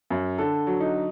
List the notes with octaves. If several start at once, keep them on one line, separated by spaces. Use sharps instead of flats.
F#2
D3 A4
F#3
D#4